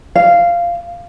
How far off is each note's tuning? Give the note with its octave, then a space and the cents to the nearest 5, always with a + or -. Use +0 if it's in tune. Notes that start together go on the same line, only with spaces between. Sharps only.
F5 -10